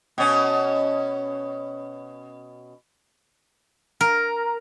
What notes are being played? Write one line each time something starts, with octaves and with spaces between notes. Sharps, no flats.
B2 C#4
A#4